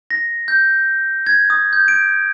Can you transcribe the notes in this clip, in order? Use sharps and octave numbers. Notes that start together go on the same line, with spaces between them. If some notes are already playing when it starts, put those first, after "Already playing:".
A#6
G6
G#6
D#6
G6
D7